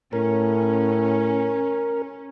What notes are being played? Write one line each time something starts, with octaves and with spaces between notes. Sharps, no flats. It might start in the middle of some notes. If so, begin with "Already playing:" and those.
A2 C#4 A#4